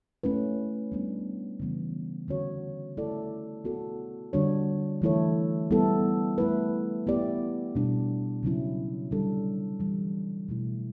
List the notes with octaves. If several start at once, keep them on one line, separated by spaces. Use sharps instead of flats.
A3 C#4 E4 B4
G3 B3 D4
C#3 E3 G3 B3
D3 G3 C#4 F#4 C#5
A3 E4 A4 D5
B3 F#4 A4
D3 G3 D4 F#4 C#5
E3 A3 E4 A4 C#5
G3 B3 E4 A4
A3 E4 B4
B3 E4 G4 D5
B2 G3 D4
C#3 F#3 C#4 E4
D3 G3 D4 A4
E3 G3 D4
B2 F#3 A3 E4